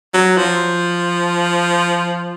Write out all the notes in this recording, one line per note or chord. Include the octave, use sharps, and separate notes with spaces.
F#3
F3